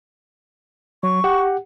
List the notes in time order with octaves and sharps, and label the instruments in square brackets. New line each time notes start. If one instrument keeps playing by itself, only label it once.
[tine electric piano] F#3 [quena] C#6
[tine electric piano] G4 F#5